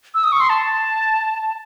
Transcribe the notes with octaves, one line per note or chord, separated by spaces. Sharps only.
E6
D#6
C#6
C6
A5